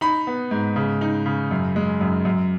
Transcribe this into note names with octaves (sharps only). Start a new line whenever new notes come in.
D#4 B5
B3
G#2
C#3
D#4
C#3
F#2
G#3
F#2
F#2